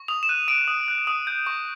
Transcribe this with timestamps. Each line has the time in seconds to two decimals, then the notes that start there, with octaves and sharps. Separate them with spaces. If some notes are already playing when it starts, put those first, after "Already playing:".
Already playing: C#6
0.08 D#6 F7
0.23 E7
0.29 F#6 D#7
0.48 D#6 D7
0.67 D#6
0.88 F#6
1.07 D#6
1.27 G6
1.47 C#6